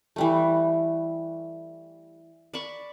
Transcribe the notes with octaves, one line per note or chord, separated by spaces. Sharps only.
E3 G3 A3
D5 A5 B5 C#6